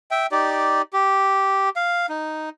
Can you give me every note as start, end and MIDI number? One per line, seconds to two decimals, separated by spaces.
0.11 0.27 76
0.11 0.27 79
0.32 0.82 63
0.32 0.82 67
0.32 0.82 74
0.93 1.69 67
1.76 2.06 77
2.09 2.49 63